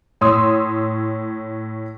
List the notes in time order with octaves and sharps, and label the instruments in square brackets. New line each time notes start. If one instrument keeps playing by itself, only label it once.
[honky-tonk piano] A2 C#5 C6 D#6 E6